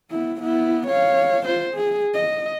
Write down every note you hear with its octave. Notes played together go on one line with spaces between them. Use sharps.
B3 E4
B3 E4
C#5 F5
F4 C5
G#4
D#5